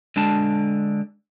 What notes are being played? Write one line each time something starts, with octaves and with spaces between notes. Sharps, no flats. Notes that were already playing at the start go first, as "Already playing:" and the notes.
D3 G#3 D4 A5